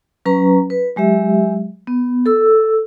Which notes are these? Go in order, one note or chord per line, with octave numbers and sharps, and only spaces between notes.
F#3 C#4 B4 A#5
B4
F#3 G#3 G4 E5
B3
A4 E6